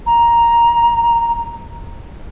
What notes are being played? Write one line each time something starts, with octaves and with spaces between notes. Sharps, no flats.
A#5